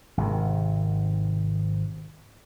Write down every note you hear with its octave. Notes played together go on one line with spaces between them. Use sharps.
G#1 C3